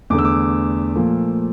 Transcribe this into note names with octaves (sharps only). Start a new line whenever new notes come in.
E2 D3 A3 D6
E6
D6
A#2 F3 A3